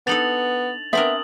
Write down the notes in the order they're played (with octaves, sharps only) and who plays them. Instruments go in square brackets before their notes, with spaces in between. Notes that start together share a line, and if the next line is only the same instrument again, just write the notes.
[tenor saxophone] B3 [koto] D4 D#4 A4 [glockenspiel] A6 F7 F#7
[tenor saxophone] B3 [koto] C4 D4 A#4 [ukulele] E5 [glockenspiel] D#6 F#7